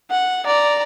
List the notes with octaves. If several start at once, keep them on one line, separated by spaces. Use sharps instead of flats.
F#5
D5 A#5